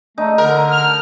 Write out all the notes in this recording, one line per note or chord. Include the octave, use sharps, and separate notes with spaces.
A3 D#4
D3 A#4
F6